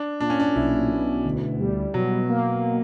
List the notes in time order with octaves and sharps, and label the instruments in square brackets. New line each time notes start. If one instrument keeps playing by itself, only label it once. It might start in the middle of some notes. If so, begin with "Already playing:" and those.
Already playing: [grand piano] D4
[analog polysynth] A#2 [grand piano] D4
[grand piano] C#4
D4
[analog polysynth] B1 [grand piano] E4
[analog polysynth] B2
D2
G3
[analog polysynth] B2 [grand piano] F#3
[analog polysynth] A#3